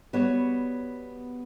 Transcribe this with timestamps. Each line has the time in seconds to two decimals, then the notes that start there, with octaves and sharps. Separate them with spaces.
0.13 G3 B3 F#4 C#5